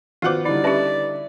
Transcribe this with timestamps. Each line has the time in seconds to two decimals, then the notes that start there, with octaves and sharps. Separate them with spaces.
0.22 D#3 B3 F4 F#4 C5 F#5 D6
0.45 D3 G3 D#4 E4 D5
0.64 C#4 E4 G4 B4 A5